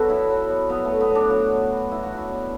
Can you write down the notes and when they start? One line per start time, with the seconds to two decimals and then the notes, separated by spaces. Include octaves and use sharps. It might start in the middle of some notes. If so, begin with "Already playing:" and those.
Already playing: F#3 B3 D4 F#4 A4 B4
0.09 B2 E4
0.30 F#3
0.50 B2
0.69 F#3 B3
0.85 F#3 A3
1.00 B3
1.10 F#3
1.15 D4
1.30 F#3 F#4
1.50 B2
1.70 F#3
1.91 B2 E4
2.03 F#4
2.10 F#3
2.17 E4
2.31 B2